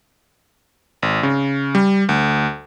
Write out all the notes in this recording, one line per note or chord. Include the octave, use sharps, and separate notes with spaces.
G#1
C#3
G3
D2